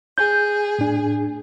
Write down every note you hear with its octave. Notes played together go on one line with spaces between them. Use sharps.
G#4 G6
A2 D4